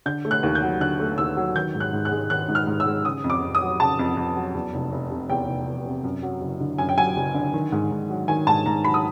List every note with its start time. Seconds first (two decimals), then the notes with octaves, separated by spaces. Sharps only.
0.06 D3 G6
0.25 A3
0.31 F#6
0.43 D#2
0.55 G6
0.62 F#3
0.81 D3 F#6
1.00 A3
1.18 D#2 E6
1.37 F#3
1.55 D#3 G6
1.75 G#2
1.80 F#6
1.93 G#2
2.05 F#6
2.11 G#3
2.30 D#3 F#6
2.48 G#2
2.55 F6
2.67 G#2
2.80 E6
2.86 G#3
3.05 C#3 D#6
3.24 F2
3.30 D6
3.42 F2
3.55 D#6
3.61 F#3
3.80 C#3 A5
3.99 F2
4.17 F2
4.36 F#3
4.55 E2
4.74 F1
4.92 F1
5.11 C3
5.30 E2 G5
5.48 F1
5.67 F1
5.86 C3
6.04 F#2
6.23 F#3
6.41 F#1
6.60 D3
6.78 F#2 G#5
6.89 G5
6.97 F#3 G#5
7.16 F#1
7.34 D3
7.54 D#3
7.72 G#2
7.91 G#2
8.10 F#3
8.28 D#3 G#5
8.47 G#2 A5
8.66 G#2 A#5
8.84 F#3 B5
8.94 D#6